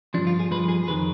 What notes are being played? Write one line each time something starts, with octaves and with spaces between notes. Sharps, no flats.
G2 F3 D4
F4
G#4
G2 F3 B4
G#4
G#4
F2 D#3 B4